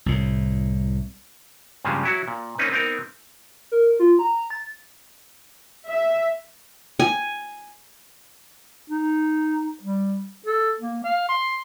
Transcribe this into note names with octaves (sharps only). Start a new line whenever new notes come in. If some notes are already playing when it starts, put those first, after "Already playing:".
C2 A2
G2 A#2 C#3 F3 G3 G#3
F#3 E4 F#4
A#2
A#3 C4 C#4 D#4 B4
B3 C4 D#4 A#4
A#4
F4
A#5
A6
E5
G#5
D#4
G3
A4
A#3
F5
C6